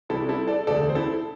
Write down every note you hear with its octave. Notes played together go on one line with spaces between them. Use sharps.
C2 C3 G3 E4 A4
E4 A4
A4 D5
E1 D2 D3 A4 D5
C5
E4 A4